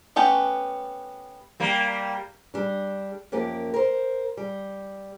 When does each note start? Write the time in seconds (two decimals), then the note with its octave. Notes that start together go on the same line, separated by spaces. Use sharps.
0.16 A3 B3 C#4 G4
1.60 G3 A#3
2.54 G3 D4
3.32 F#2 F3 A#3 G4
3.74 A#4 C5
4.37 G3